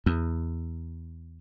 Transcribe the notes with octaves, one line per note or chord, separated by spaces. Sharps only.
E2